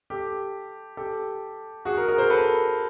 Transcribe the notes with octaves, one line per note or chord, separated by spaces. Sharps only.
G4 A4
G4 A4
F#4 G#4
G#4 A#4
G#4 A#4
A#4 C5
A4 B4